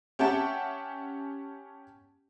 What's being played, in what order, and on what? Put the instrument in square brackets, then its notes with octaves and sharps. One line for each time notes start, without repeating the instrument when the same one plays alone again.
[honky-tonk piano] C#4 G4 E5 F#5 G5 A5